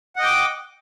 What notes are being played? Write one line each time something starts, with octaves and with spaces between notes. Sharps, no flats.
D#5 F#5 G5 D6